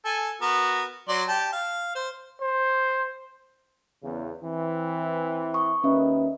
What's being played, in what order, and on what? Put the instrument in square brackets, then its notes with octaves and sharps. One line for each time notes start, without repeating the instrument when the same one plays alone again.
[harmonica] A4 G#5
B3 F#4 A#4
F#3 D5 C6
G4 A5
F5
C5
[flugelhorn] C5
[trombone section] E2 C#3
E3 C4
[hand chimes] C#6 D#6
[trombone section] D#2 A#4 B4 [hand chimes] C#4 D#5 E5